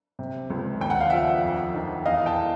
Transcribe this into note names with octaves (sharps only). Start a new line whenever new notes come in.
C3
C#2
D#2 G5
F#5
F5
F3 E5 F#5
F2
D#3
E2 D#5 F5
G5 A5